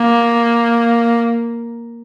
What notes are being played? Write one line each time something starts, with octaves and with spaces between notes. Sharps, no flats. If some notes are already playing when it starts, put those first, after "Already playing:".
Already playing: A#3